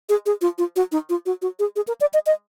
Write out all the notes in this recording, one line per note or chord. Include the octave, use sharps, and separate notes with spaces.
G#4
G#4
F4
F4
F#4
D#4
F4
F#4
F#4
G#4
G#4
A#4
D5
D#5
D#5